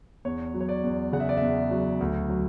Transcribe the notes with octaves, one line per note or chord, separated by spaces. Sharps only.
E2 C#5
F#3
C#5
D5
E2
C#3 F#5
E5
D5
E2 E5
F#3
D2
F#3